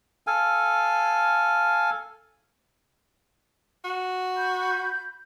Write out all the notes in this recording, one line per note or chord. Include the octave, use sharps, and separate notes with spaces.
A4 F5 G#5
F#4
B5 G6